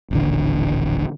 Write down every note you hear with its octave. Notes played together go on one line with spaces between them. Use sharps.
D#1 A1 D3